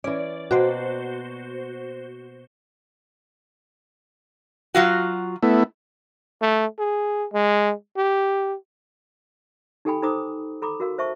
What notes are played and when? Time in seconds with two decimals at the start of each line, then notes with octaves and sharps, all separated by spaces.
0.04 E3 C#4 D5
0.51 B2 A#3 F#4 C5 G5
4.75 F#3 F4 F#4
5.43 A3 B3 E4
6.42 A3
6.79 G#4
7.33 G#3
7.97 G4
9.85 D#4 G4 A4 G5 G#5 B5
10.03 D#4 A4 C5 A#5 D6 D#6
10.62 A4 A#5 B5 D6
10.80 F#4 A#4 F5
10.98 C5 E5 A5 C#6